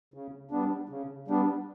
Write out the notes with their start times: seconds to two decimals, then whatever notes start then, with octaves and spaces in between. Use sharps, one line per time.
0.14 C#3
0.51 G3 B3 D4
0.89 C#3
1.28 G3 B3 D4